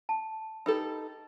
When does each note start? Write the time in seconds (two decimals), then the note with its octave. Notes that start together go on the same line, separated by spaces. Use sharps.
0.09 A5
0.66 D#4 G4 A4 B4 B5